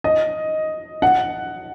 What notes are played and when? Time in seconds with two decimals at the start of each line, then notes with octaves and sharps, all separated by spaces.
0.04 D#5
1.02 F#5